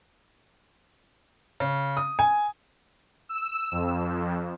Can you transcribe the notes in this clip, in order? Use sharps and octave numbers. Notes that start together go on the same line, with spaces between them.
C#3
D#6
G#5
E6
F2